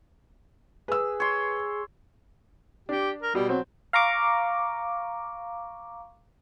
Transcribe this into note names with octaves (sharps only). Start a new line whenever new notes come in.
G#4 B4 E6
C#5 C6
D4 G4
A#4
B2 G3
F#3 C4
F5 A#5 C#6 D6